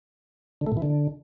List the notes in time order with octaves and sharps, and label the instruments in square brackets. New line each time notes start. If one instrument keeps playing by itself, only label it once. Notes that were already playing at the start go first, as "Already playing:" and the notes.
[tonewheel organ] D3
A3
A#2
E3
D3